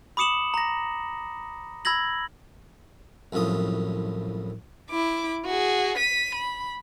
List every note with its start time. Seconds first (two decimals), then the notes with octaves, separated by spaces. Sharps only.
0.17 B5 D6 D#6 C#7 E7 F#7
0.54 A#5 A#6
1.85 B5 E6 G#6 A#6 F#7
3.33 C2 F#2 A2 F3 D#6
4.90 E4 D6
5.46 F#4 G#4
5.97 B6 D#7
6.35 B5